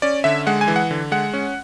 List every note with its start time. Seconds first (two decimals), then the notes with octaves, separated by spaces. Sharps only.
0.02 C#4 D5
0.24 D3 E5
0.47 G#3 F#5
0.61 G#5
0.68 E3
0.76 F#5
0.91 D3
1.12 G#3 F#5
1.33 C#4